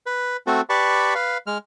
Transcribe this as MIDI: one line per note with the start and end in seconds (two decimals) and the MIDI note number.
0.06 0.37 71
0.47 0.61 57
0.47 0.61 60
0.47 0.61 66
0.47 0.61 69
0.70 1.14 67
0.70 1.14 71
0.70 1.14 74
0.70 1.14 81
0.70 1.14 83
0.70 1.14 85
1.15 1.38 71
1.15 1.38 77
1.47 1.58 56
1.47 1.58 89